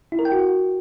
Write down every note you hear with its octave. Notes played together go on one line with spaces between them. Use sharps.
E4
A#4
G5
F#4